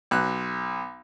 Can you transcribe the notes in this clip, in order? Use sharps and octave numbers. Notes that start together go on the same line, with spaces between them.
B1 F#6